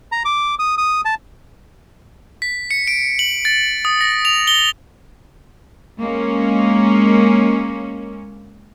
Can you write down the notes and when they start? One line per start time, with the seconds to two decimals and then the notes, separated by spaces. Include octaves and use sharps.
0.12 A#5
0.25 D6
0.59 D#6
0.78 D#6
1.05 A5
2.42 B6
2.71 C#7
2.87 D7
3.19 F#7
3.45 A6
3.85 D#6
4.01 A#6
4.25 F7
4.47 G7
6.01 G#3 A#3 C#4